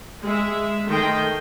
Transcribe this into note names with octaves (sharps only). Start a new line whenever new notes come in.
G#3 E5
D#3 A3 G5 C6